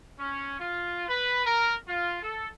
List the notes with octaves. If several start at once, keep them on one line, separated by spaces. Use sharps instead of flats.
C#4
F4
B4
A#4
F4
A4